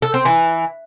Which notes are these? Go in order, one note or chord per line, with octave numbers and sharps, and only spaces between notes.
A4
C4
E3